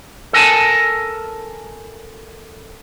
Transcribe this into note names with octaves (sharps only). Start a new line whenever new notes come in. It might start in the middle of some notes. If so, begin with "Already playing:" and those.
A4 A#4 G#5 A5